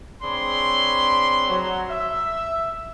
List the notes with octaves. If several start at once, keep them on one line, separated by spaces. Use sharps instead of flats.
C4 D4 G#4 C#5 B5 C6
F#3
E5